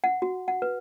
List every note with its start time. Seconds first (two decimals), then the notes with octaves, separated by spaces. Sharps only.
0.04 F#5
0.22 F#4
0.48 F#5
0.62 B4